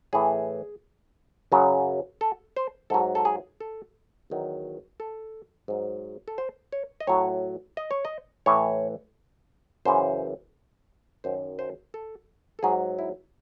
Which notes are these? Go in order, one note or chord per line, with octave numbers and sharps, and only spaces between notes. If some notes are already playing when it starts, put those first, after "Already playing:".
A2 E3 G#4
F#2 C#3 F#3
A4
C5
G#2 F#3 A4
A4
G#4
A4
E2 D#3 F#3
A4
G#2 F#3
A4
C5
C#5
D#5
A2 F#3 C#5
D#5
C#5
D#5
A2 E3 C#5
F#2 C#3 E3 C5
F#2 D#3 F#3 C5
C5
A4
A4
G#2 F#3 G#4
E4